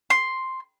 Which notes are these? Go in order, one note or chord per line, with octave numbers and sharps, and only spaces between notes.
C6